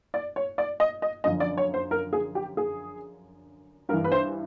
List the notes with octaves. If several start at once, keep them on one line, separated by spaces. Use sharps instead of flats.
D5
C#5
D5
D#5
D#5
F#2 D3 F3 D#5
D5
C#5
C5
A#4
G#4
G4
G#4
G2 E3 A#4
B4
C5